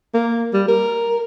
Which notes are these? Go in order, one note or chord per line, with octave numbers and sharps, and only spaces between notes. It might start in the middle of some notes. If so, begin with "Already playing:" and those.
A#3
G3
A#4